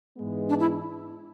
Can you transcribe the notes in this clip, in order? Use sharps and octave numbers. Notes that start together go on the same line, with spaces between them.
G#2 E3 G#3 B3
D4
E4